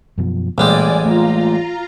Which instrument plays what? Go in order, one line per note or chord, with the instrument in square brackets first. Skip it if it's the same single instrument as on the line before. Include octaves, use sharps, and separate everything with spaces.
[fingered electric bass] F#2 B2 F3
[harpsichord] A1 G3 G#3 [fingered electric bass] A#2 [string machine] D5 G#5
[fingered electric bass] A3 A#3 [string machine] F4 A#5